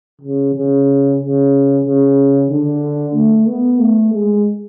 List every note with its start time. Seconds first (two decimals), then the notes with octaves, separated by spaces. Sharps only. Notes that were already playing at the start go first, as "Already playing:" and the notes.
0.21 C#3
0.54 C#3
1.19 C#3
1.85 C#3
2.50 D3
3.15 A3
3.48 B3
3.79 A3
4.13 G#3